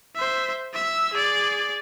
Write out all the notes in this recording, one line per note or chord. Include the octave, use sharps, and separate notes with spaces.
C5 E5
E5 E6
G#4 D5